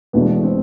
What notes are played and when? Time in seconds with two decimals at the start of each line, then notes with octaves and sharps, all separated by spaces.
0.13 E1 E2 B2 A3 B3
0.43 C4